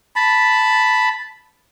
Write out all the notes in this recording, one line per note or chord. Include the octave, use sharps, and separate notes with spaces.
A5 B5